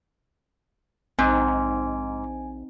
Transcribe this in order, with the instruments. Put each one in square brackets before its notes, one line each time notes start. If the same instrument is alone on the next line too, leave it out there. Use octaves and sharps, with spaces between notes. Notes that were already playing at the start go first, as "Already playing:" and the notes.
[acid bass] A#1 [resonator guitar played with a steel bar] G#2 [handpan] C4 D#4 [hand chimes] G#5